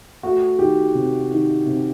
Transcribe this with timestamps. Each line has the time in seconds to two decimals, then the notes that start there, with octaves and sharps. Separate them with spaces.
0.23 A3 F#4
0.59 D#3 G4
0.95 C3
1.31 D#3
1.66 C3